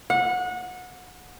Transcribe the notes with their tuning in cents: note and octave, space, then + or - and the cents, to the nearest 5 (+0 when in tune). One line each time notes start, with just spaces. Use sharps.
F#5 -25